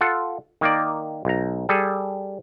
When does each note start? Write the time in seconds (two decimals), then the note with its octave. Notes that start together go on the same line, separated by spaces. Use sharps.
0.01 F4 A4 F#5
0.61 D#3 A#3 D5
1.25 B1 A#5
1.69 G3 G#4 A4